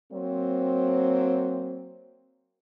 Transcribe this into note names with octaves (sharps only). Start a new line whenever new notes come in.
F#3 A#3 C4